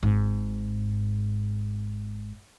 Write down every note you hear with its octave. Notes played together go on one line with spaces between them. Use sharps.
G#1 G#2